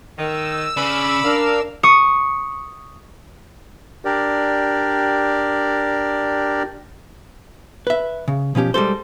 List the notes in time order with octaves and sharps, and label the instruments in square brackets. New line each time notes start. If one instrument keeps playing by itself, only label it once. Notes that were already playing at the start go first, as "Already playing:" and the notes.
[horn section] D#3 [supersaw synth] E6
[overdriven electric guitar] C#3 [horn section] D5 B5
[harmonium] D4 A#4 [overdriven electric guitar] F5
[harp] C#6 D#6 C#7
[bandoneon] D4 G4 A#4 D5
[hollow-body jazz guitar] B4 E5
C#3
B2 F3 C#4 G4
G3 G#3 A4 C5